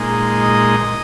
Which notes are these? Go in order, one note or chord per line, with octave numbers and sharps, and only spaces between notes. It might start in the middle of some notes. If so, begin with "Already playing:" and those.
Already playing: A#2 G#3 D#4
D#5